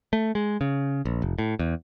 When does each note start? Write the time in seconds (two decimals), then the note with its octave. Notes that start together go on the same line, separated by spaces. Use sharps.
0.13 A3
0.35 G#3
0.61 C#3
1.05 A#1
1.22 F1
1.39 A2
1.59 E2